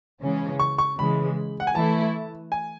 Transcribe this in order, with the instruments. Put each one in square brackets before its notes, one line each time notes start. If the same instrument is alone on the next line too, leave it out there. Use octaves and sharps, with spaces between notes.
[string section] C#3 E3 G#3 C#4
[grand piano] C#6
C#6
[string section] C#3 E3 G#3 [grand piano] B5
[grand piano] F#5
G#5
[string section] E3 A3 E4 [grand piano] A5
[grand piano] G#5